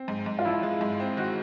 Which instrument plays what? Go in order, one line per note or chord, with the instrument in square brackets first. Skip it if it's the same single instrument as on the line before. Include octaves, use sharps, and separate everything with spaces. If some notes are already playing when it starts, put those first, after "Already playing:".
Already playing: [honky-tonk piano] C4
G#2
G#2
[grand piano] F4
[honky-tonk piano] F3 [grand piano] E4
[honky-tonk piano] G#3
G#2
C4
[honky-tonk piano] D#3 [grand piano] F#4